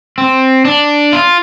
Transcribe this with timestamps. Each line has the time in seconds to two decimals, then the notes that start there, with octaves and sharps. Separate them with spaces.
0.18 C4
0.65 D4
1.13 F4